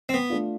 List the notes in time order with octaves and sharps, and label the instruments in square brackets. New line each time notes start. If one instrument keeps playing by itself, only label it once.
[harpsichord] C4
B3
[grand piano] A3 D4 F4